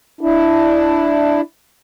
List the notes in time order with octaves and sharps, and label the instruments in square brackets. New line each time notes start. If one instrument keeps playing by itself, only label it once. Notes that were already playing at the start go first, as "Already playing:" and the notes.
[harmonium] D4 E4